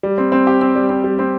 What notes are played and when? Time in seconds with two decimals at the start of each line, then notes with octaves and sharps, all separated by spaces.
0.03 G3
0.18 C4
0.32 C4
0.47 G4
0.61 C4
0.76 G3
0.89 C4
1.04 G3
1.19 C4